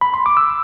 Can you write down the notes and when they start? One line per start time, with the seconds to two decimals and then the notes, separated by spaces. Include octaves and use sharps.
0.01 B5
0.14 C6
0.26 D6
0.37 E6